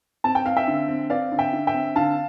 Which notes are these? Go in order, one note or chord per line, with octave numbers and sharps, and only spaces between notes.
C4 A5
G5
C4 F5
E5 G5
D3
C4
C4 D5 F5
D3
E5 G5
D3
E5 G5
C4
D3 F5 A5